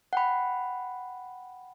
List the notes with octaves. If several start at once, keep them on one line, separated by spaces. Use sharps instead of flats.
F#5 G5 B5